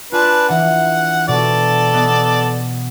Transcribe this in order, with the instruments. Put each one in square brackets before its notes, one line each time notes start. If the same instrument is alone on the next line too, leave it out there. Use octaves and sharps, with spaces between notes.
[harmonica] D4 B4 [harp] F4 G#5
[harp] E3 D4 [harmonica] F#5
[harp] B2 [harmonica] A4 D5
[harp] B3 D#5